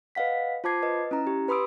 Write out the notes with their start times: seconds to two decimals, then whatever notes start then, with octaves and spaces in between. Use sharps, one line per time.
0.15 B4 D#5 F5 F#5 B6
0.64 F4 C5 A5 D6 G#6 C7
0.82 B4 D#5
1.11 C#4 E4 A#5
1.27 G4
1.48 B4 B5 C6 D#6 E6 D7